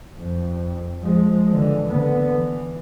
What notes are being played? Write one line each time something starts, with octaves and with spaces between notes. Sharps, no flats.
F2
F3 G#3
D3 E3
D3 B3
E3